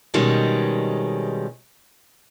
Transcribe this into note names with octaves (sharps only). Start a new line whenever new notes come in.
B2 D#3 G3 G#3 C4 C#4